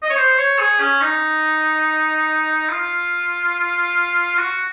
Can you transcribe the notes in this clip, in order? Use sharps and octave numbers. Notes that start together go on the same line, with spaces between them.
D#5
C#5
C5
C#5
G#4
C#4
D#4
F4
F#4